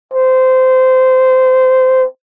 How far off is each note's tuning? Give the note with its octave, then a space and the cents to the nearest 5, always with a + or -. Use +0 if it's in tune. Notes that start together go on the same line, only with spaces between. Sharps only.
C5 -20